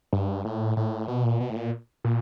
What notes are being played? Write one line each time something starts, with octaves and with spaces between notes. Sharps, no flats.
G2
A2
A2
B2
A#2
B2
A2
A#2
A#2